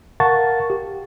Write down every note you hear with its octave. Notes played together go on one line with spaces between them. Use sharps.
A#4 F5 F#5 A5 C#6 A6
G4